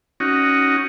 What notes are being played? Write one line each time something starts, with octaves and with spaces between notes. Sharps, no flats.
C#4 D#4 F#4